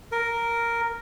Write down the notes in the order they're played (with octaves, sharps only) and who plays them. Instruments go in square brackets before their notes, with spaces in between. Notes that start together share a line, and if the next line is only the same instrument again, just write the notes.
[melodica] A#4